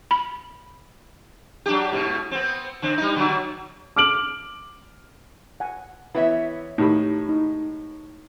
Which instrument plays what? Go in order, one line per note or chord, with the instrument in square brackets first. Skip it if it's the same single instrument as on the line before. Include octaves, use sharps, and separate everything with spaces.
[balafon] B5
[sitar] F#3 D4 G4
G#2 B2
B3 C4
D3 C4
G3 D#4
B2 D3 F#3
[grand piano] D6 F6 D7 F#7
[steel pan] F#5 G#5
[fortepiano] E3 B3 [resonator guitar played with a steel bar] E4 C#5 E5
[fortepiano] A2 D#3 B5 [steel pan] D#4 G4
[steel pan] D#4